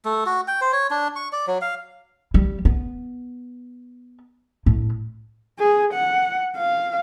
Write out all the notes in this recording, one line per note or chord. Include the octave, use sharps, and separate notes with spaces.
A3
F#4
G5
C5
C#5
D4
C#6
D5
F#3
F5
G3
B3
A2
G#4
F#5
F5